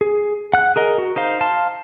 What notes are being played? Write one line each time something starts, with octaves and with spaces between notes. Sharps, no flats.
G#4
F#5 F#6
G#4 A#4 D#5
F#4
D#4 C5 F5
F5 A5 C6